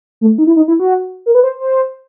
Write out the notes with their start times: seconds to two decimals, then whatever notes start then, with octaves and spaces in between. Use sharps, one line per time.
0.21 A3
0.38 D#4
0.47 E4
0.56 D#4
0.68 E4
0.80 F#4
1.26 A#4
1.35 B4
1.43 C5
1.60 C5